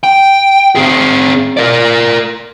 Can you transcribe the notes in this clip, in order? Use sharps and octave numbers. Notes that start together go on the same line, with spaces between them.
G5
C4 G#4
A#4 D5